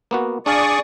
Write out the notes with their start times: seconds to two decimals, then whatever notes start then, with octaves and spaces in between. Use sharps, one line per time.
0.11 A#3 B3 F#4
0.46 D4 G#4 D5 F5 C#6 D#6